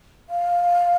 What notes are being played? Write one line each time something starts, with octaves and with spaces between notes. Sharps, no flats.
F5